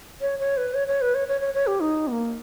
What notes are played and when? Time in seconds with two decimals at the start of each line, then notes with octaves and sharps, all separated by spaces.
0.21 C#5
0.39 C#5
0.57 B4
0.74 C#5
0.88 C#5
1.01 B4
1.15 C#5
1.28 C#5
1.41 C#5
1.54 C#5
1.67 G4
1.80 D#4
2.07 B3
2.12 A#3